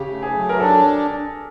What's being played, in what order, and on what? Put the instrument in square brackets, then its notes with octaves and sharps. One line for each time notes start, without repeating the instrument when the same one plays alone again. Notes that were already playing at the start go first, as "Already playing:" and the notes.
Already playing: [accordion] C#3 [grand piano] G4
[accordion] A3
[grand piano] G#4
[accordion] F#3
[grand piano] A#4
[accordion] D4 [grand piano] A4